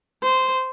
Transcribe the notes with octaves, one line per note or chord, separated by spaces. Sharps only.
C5